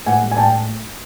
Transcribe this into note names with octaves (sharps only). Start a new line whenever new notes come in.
A2 F#5 G#5
G3
G#5
A2 G5 A5